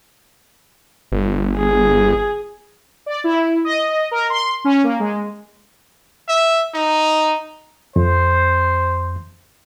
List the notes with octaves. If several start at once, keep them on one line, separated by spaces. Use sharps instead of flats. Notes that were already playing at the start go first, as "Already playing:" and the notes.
G1
G#4
D5
E4
D#5
A#4
C6
C#4
A#3
G#3
E5
D#4
F2 C5